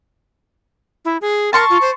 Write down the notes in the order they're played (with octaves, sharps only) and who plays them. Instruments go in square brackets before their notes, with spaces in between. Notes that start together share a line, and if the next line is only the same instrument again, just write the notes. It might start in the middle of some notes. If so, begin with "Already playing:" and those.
[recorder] E4
G#4
[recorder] A#4 [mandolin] A5 C6 C#6
[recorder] F4
C5